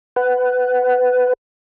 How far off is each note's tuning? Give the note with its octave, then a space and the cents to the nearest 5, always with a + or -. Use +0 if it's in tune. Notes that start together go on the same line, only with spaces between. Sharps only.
B4 +20 F#5 +15